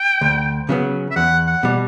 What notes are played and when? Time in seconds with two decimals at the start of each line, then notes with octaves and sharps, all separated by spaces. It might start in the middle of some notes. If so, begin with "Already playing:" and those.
Already playing: G5
0.21 D2
0.69 C#3 F#3 B3
1.11 E5
1.16 E2 F#5
1.47 F#5
1.63 B2 G3